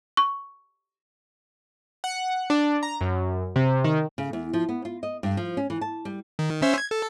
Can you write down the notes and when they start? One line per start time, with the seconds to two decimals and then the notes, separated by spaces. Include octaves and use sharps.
0.17 C#6
2.04 F#5
2.50 D4
2.83 A#5
3.01 F#2
3.56 C3
3.84 D#3
4.18 C#3
4.33 E2
4.53 F3
4.69 B3
4.85 F4
5.03 D#5
5.23 G2
5.37 F3
5.57 C#4
5.70 E3
5.81 A5
6.05 G3
6.39 D#3
6.62 C#4 C5 E5
6.78 G#6
6.91 A4